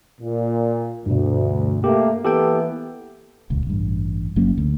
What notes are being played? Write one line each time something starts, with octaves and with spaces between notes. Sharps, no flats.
A#2
D2 G2 B2
A3 A#3 G4
E3 A#3 B3 G4 A4 G5
D#1 C#2
A1 G2
F#1 F#3 A#3 C#4
D2